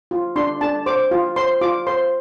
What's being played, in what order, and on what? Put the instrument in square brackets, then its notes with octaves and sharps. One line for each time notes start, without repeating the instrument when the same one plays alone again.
[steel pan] F4
D4 C6
D4 A5
C5 D6
F4
C5 C6
F4 D6
C5 C6